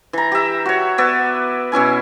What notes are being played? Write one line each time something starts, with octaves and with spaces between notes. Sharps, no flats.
E3 A#5
G4 E5
F#4 C#5
B3 B4 D5 E5
B2 C#4 E4 G#5